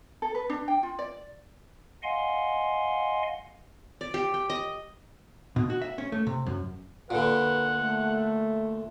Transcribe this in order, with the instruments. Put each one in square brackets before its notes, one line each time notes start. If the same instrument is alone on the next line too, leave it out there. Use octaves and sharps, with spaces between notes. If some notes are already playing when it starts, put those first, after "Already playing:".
[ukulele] A4
B4
D4
G5
F4
D5
[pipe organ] D#5 F5 F#5 G#5 C6
[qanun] D5
G4
G5
D#5
[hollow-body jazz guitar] B2
F#4
E5
C#4
A3
C3
F#2
[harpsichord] A#2 D3 [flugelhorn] B4 [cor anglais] F#5
[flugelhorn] A3